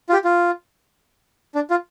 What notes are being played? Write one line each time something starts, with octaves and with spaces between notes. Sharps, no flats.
F4
G4
F4
D4
F4